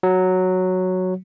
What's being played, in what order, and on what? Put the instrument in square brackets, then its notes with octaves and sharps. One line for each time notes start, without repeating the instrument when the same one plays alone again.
[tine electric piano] F#3